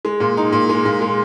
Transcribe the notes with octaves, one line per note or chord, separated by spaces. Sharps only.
G#3
A#2
D#4
A#2
G#3
A#2
G#3